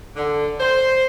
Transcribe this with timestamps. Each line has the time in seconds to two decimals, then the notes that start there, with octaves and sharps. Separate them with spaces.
0.15 D3
0.60 C5